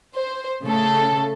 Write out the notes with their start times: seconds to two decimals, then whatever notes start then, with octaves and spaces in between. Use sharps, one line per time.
0.15 C5
0.62 C#3 A3 A4